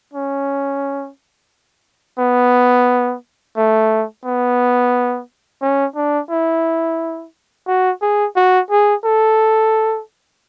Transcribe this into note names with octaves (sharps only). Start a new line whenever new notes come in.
C#4
B3
A3
B3
C#4
D4
E4
F#4
G#4
F#4
G#4
A4